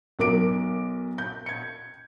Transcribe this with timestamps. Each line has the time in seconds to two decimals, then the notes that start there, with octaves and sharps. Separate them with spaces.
0.19 B1 A#4 D6 D7
1.18 G6
1.46 G#6 C#7